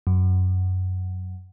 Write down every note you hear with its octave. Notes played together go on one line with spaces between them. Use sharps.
F#2